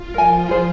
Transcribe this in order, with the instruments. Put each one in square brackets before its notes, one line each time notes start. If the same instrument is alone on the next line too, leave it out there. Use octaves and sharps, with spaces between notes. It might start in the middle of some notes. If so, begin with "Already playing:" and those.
Already playing: [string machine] F4
[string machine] F3 [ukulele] A#4 G#5
[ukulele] F4 G#4 C5